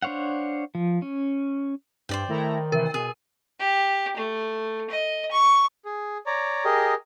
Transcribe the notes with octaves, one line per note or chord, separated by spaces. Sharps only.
D4 C5 C#5 F5 F#5
F3
C#4
G2 C5 D5 G5
D#3 A3 E4 A#5
C3 E3 A3 A#4
B2 G#4
G4
A3
D#5
C#6
G#4
C#5 D5 A#5
G4 G#4 A#4 D#5